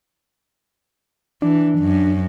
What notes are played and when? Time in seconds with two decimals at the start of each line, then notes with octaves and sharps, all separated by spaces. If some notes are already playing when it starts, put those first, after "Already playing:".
1.42 E3 D4
1.79 F#2